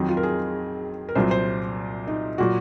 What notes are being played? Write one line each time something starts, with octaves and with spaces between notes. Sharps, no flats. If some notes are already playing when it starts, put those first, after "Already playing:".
Already playing: F2 D#3 F#3 D#4
F4
A#4
G#4
A#4
C2 A#2 F#3 C5
C5
D#4
A#2 F#3 F#4